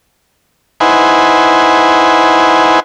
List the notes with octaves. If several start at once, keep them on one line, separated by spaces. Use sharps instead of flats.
D#4 E4 B4 C5 F#5 G#5